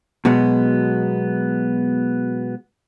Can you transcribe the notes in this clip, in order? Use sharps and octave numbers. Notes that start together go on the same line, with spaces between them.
B2 F#3 G#3 B3